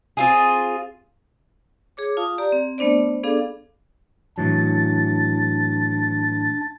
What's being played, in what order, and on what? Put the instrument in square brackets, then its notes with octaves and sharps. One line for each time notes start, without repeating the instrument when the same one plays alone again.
[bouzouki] C4 F4 G#4
[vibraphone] G#4 C#5 D6
F4 F5 A5 D#6
G4 D5 A#5
C4
A3 B3 D4 C5 D5
B3 D4 G#4 A4 D5 F5
[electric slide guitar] A2 E3 F#3 [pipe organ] D4 A6